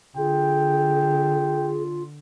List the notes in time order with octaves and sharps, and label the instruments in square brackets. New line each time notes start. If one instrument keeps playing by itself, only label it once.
[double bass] D3 [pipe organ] F4 [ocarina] G#4 [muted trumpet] G5